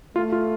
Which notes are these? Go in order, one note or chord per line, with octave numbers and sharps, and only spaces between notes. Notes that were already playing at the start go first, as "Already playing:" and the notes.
A3 F4
F4